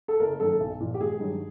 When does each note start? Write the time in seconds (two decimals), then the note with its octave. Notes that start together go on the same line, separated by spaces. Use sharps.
0.08 A4
0.20 F#1 A#4
0.40 F#2 D#3 A4
0.60 B1
0.80 A#2 F3
0.94 G4
1.00 G#1 G#4
1.20 G2 D#3 F#3